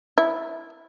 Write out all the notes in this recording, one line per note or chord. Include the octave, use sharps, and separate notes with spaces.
E4